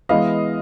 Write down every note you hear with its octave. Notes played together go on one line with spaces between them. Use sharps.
E3 G#3 B3 D#5 F5